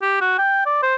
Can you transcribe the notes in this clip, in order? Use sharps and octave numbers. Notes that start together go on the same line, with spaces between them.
G4
F#4
G5
D5
C5